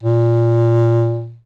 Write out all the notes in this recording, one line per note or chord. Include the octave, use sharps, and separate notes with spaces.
A#2